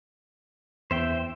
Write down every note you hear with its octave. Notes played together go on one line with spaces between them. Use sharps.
E2 C5 E5 G5